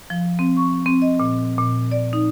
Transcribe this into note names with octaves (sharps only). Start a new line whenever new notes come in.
F3
C4
C#6
C4
D#5
A#2
A#2
D5
D#4